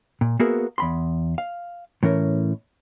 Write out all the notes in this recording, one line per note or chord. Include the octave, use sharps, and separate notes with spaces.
A#2
A#3 B3 F#4 G#4 A#4 E5
E2 B5 C6
F5
A2 E3 C#4 A#4